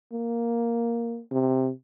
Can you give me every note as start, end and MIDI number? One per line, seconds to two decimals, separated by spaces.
0.13 1.20 58
1.31 1.71 48